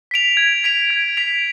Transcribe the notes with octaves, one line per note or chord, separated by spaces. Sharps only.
B6 D7 F7
G#6
B6 D7 F7
G#6
B6 D7 F7